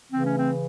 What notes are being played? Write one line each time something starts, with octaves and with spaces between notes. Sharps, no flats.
C#3 E3 A3 C4
C#4
C4